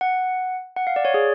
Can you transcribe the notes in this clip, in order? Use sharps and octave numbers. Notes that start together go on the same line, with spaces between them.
F#5
F#5
F5
D5
C#5
G#4